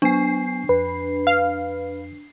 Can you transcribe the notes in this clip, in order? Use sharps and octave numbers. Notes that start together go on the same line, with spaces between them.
F#3 B3 D4 G#5 C7
F2 B4
F5